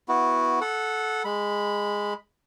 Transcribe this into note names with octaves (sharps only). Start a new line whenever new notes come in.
B3 E4 F#4
A4 F#5
G#3 B5